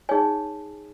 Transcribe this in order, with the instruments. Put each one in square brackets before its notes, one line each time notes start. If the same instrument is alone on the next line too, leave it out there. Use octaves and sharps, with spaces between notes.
[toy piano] D#4 G#4 C#5 G#5